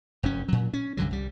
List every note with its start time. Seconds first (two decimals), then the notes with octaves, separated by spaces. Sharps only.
0.23 F1 F#2 C#4
0.48 A#2 F#3
0.73 C#4
0.97 C2 G2 D3 F#3
1.11 C2 G3